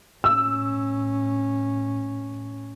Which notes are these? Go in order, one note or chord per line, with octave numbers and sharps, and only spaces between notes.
A2 C#4 E6